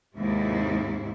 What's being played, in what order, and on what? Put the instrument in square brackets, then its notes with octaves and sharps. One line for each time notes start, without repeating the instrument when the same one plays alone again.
[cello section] D#2 G#2 C3 E4